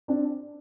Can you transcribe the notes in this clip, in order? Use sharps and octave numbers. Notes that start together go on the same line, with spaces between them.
C4 D4